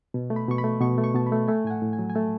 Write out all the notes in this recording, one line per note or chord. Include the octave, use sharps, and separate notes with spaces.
B2
A3
B5
B2 C#6
B5
A3
B2 C#6
A3
C#6
B2 A5
B5
A3
A3 G#5
A2 G#5
F#5
A2
G#5
F#3
G#5
A3 A5